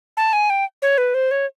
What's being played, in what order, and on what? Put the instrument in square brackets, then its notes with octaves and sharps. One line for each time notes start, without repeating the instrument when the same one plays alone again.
[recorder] A5
G#5
G5
C#5
B4
C5
C#5